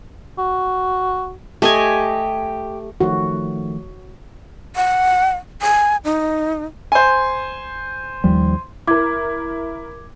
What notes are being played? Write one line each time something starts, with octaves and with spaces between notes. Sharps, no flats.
F#4
A3 G4 D#5 G#5
D#3 F3 A3 F#4
F#5
G#5
D#4
C5 G#5
D#2 F3 G3
E4 A#4 D6 G#6